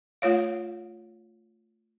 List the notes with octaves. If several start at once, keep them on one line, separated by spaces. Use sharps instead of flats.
A3 F4 C#5 F5